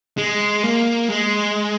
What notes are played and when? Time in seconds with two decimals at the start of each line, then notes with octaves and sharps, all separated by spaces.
0.18 G#3
0.63 A#3
1.09 G#3